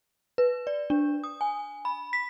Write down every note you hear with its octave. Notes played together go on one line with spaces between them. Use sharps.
B4
D5
D4
D#6
G#5
B5
B6